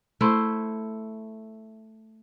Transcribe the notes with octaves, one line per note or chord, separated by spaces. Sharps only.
A3 E4 C5